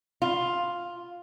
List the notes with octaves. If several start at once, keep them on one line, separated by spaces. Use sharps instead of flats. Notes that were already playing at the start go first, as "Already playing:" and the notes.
F4